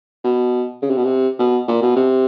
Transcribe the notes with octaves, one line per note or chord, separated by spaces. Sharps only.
B2
C#3
C3
B2
C3
B2
A#2
B2
C3